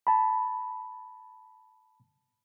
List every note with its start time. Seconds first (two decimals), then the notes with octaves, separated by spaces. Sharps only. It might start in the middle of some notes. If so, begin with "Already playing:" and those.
0.07 A5 B5